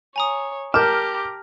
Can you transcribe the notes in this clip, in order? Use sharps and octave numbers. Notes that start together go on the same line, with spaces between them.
C#5 G#5 A#5 D#6
G4 A#4 A5 A#5 D6 F6 G6